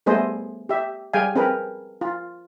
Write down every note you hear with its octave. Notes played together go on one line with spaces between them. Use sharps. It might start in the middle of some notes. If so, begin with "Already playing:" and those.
G3 A3 B3 G#4 C5 D#5
G4 E5
G3 G#4 F5 G5 G#5
C4 G#4 A#4 B4
F4